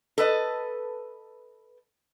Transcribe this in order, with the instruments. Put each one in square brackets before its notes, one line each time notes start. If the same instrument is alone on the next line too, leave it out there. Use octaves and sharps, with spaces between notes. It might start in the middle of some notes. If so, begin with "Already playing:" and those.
[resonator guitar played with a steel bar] A4 B4 D#5